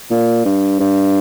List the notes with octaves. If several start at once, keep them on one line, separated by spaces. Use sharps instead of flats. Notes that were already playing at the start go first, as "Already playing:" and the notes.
A#2
G2
G2